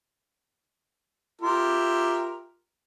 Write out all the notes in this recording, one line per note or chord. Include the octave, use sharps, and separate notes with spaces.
F4 G4 A#4 E5